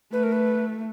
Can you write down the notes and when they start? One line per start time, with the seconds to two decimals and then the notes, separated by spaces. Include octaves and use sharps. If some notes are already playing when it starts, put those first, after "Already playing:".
0.13 A3 B4
0.23 A#4
0.32 B4